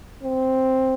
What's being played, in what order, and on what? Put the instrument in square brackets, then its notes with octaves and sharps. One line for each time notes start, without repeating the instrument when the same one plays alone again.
[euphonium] C4